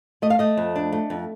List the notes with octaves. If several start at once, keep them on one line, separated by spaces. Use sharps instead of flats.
A3 D#5
F5
A3 D#5
F2
D4
A3
F2